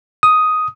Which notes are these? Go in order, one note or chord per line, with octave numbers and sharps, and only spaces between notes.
D#6